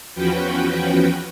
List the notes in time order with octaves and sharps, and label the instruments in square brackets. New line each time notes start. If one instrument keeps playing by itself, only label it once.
[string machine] E2 F3 C#4 F#4 B4 G5